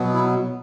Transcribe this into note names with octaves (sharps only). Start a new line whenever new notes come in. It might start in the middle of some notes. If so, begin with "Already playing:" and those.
Already playing: B2 F#3 B3
E4